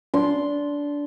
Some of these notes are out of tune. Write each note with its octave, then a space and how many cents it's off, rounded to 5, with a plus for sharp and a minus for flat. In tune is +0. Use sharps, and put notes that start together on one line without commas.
D4 -20 C6 +0